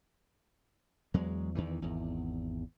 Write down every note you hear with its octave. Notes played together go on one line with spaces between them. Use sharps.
E2 F#3 G#3
E2 D#3 E3
G#1 E2